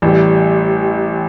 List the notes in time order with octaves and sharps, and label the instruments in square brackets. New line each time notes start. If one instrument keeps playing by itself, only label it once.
[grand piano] A1 A2 G3